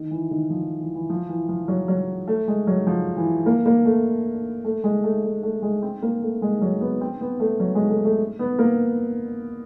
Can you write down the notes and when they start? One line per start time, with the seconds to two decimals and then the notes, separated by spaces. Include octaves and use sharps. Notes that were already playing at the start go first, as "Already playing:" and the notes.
Already playing: D#3
0.11 E3
0.31 D#3
0.50 F3
0.80 E3
0.95 E3
1.10 F3
1.29 E3
1.49 F3
1.68 F#3
1.88 F#3
2.28 A3
2.48 G#3
2.67 F#3
2.87 F3
3.17 E3
3.46 A#3
3.66 A#3
3.85 A3
4.64 A3
4.84 G#3
5.04 A3
5.23 A3
5.43 A3
5.62 G#3
5.82 C4
6.02 A#3
6.22 A3
6.42 G#3
6.62 F#3
6.81 B3
7.01 C4
7.21 B3
7.40 A3
7.60 F#3
7.75 G#3
7.89 A3
8.05 A3
8.39 B3
8.59 A#3